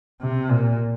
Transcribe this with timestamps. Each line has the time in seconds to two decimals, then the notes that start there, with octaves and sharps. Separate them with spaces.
0.21 C3
0.50 A#2